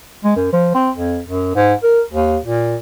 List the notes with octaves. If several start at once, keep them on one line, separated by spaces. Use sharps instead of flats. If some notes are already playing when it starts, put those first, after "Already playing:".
G#3
F#2
F3
C4
F2
F#2
G#2
A#4
D#2
A#2